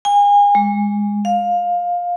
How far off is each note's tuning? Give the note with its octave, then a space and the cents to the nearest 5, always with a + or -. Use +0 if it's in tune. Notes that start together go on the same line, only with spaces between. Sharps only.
G#5 -35
G#3 -15
F5 +15